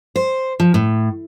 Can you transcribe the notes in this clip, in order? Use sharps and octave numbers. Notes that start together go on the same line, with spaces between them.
C5
F3
A2